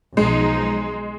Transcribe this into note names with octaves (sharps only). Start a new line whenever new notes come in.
B1 F3 G#3 D#4